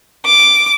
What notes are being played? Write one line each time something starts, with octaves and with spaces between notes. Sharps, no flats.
D6